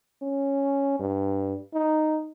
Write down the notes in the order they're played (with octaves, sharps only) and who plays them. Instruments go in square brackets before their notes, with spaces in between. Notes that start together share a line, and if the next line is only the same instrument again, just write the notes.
[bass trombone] C#4
G2
D#4